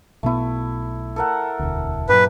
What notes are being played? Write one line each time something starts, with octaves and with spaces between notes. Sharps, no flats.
B1 B2 A3 B3 E4
A4 A#4 F#5
E1 D2
G2 A#2 F#3 G4 B4